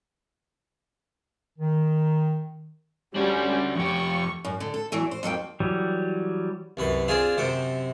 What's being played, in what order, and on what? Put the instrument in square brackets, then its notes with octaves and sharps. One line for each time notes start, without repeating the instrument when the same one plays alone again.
[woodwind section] D#3
[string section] G3 C#4 [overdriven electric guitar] D4 F#4
[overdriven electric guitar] F2 G4 [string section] C#6
[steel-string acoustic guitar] F#2
D3
A4
E2 E3 F#3
C5
F2 F#3 A#3 G5
[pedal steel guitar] E3 F#3 G3
[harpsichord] C2 F#2 B4
C4 D4 F4 G#4 G#5
F#2 C3 C5 G5